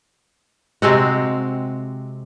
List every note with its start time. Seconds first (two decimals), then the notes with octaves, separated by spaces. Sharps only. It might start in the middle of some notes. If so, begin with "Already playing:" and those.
0.82 C3 G#3 C4 F#4